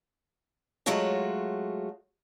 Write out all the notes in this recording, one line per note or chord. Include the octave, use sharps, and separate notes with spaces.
F#3 G#3 A3 F4 F#4 C#5